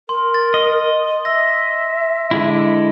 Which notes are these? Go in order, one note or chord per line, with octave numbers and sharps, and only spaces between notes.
A#4 C6
A6
D#5
E5 E6 A#6
D3 G#3 E4